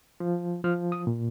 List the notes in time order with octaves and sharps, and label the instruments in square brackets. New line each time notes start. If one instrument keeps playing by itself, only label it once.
[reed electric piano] F3
F3 F6
D#6
A#2